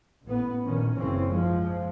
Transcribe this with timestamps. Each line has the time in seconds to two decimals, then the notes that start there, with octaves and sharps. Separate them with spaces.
0.24 A1 B3
0.64 A#1 G2 D#3 C#4
0.95 F#1 B1 C#3 E3 C4 C#4
1.29 G#2 F3 G#3